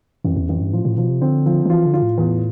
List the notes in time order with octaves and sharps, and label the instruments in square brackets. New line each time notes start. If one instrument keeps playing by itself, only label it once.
[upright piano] A1 [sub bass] F2
[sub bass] E2
[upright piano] A1 [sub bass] F2
[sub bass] G2
[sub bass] A2 [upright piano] F3
[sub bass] A2
[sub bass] B2 [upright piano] F3
[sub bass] C3
[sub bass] D3 [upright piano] C4
[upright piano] F3
[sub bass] D3
[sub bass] E3 [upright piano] F4
[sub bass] D3
[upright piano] F4
[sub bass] A2
[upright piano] E2